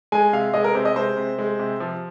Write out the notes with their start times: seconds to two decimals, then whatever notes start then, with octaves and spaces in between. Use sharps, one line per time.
0.12 G#3 G#5
0.33 C3 F5
0.54 G#3 D#5
0.64 A#4
0.74 C3 C5
0.85 D#5
0.96 G#3 C5
1.17 C3
1.38 G#3
1.59 C3
1.80 F3